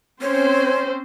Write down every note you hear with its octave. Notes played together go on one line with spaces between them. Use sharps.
C4 C#4 C5 C#5